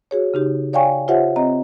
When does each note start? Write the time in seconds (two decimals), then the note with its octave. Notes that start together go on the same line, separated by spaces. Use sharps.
0.11 F#4 G#4 C#5
0.34 C#3 D#4 G4
0.73 C#5 D5 F5 G5 G#5 C#6
1.08 F4 G4 C5 C#5 E5 F#5
1.36 C4 D#5 A#5